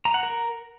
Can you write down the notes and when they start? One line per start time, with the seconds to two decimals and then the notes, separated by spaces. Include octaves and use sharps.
0.05 A#5
0.14 F#5
0.23 A#4